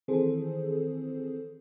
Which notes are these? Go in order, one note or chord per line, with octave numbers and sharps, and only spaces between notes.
D#3 E3 C4 G#4 A4 C5